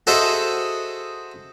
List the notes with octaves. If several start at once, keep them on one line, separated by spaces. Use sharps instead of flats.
F#4 G#4 A4 C5 D#5 E5